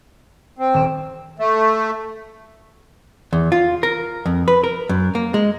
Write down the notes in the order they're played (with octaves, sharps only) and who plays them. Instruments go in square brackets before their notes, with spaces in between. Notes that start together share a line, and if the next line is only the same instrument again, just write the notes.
[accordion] C4
[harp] D#1 E7
[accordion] A3
[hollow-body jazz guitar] E2
F4
A#4
F2
B4
A#4
F#2
A#3
G#3